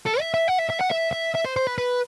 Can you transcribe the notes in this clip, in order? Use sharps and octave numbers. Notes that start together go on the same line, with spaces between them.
A4
E5
E5
F#5
E5
E5
F#5
E5
E5
E5
C5
C5
B4
B4